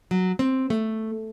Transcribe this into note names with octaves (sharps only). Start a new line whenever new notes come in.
F#3
C4
A3